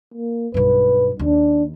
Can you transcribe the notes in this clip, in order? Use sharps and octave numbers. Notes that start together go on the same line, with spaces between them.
A#3
B1 G2 B4
D#2 D4